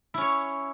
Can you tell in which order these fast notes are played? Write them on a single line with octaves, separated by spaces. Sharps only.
E4 C#4 C#5